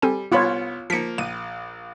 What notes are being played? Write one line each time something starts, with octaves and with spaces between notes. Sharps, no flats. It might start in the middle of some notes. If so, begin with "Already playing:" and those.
G3 C4 A4 G#5
C2 B3 F4 C#5 B5
F3 A#3 B6 C#7
A#1 D#7